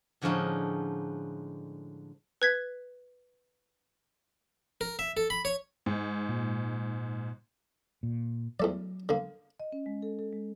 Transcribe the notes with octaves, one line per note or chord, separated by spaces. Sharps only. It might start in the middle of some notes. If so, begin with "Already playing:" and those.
A2 D3 F3 G#3 C#4 D#4
B4 G#6 B6
A#4
E5
A4
B5
C#5
G#2
A#2
A#2
E2 F#3 A3 D5
D3 A#3
D#5
C#4
G#3
A4
A4
G#3